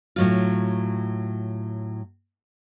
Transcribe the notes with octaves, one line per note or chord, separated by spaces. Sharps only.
A2 F#3 F4